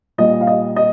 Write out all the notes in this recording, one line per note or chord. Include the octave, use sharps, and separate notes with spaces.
A#2 G3 D#5
F5
D#5
D#5